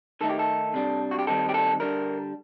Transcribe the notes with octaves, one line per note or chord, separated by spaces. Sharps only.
D#3 A3 D#4 A4
G4
A4
C3 G3 D4
F#4
G4
D#3 G3 C4 D#4 A4
G4
A4
D3 G3 D4 A#4